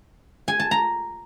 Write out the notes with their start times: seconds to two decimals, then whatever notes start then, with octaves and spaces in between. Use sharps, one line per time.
0.48 G#5
0.60 A5
0.71 A#5